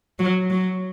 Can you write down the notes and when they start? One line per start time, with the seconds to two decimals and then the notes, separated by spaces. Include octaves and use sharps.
0.19 F#3
0.50 F#3